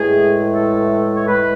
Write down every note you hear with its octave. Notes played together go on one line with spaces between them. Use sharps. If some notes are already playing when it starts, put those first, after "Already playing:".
Already playing: A2 E3 G#3 G#4
A4
C#5
A2 E3 G#3 B4